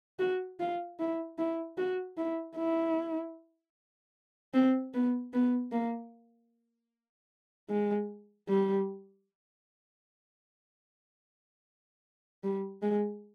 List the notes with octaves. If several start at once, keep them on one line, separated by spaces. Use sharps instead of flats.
F#4
F4
E4
E4
F#4
E4
E4
C4
B3
B3
A#3
G#3
G3
G3
G#3